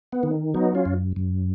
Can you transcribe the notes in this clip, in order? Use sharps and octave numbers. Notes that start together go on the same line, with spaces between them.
B3
D#3
F#3 B3 D#4
C#4 F4
F#2
F#2